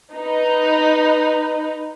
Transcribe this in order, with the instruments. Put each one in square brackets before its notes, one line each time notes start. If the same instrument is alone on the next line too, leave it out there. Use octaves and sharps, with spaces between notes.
[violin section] D#4 B4